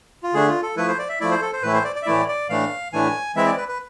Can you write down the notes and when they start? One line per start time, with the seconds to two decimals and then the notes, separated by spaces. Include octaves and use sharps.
0.23 F4
0.34 D3 A3 D4 G#4
0.48 F4
0.63 A4
0.76 F3 A3 E4 B4
0.88 C5
0.99 D5
1.09 E5
1.21 F3 A3 E4 D5
1.31 C5
1.42 A4
1.53 C5
1.63 A2 E3 A3 E4 B4
1.74 C5
1.84 D5
1.96 D5
2.02 E5
2.06 A2 E3 A3 E4 D5
2.28 D5
2.49 A2 E3 A3 D4 F5
2.93 A2 E3 A3 D4 G#5
3.36 E3 G#3 C4 E4 E5
3.46 D5
3.57 B4
3.68 B4